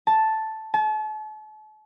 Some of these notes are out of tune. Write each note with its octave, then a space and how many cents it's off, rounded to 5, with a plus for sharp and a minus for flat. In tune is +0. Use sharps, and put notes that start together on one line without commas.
A5 +0
A5 -40